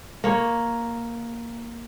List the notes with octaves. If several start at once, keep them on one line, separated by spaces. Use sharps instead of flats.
A#3 C#5